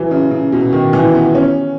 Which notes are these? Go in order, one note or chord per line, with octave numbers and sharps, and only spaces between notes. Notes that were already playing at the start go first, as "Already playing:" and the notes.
Already playing: E3 F#3
C#3
C#3
B2
D#3
E3
B3
C#4